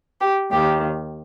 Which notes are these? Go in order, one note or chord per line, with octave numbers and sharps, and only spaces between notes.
G4
D#2 D#3 G4